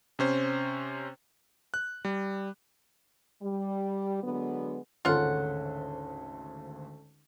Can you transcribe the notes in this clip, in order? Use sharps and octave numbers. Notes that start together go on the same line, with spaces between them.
C3 C#4 C5
F#6
G3
G3
D3 F#3 G#3 B3
G#1 D2 C#3 C#4 F4 A4 F#5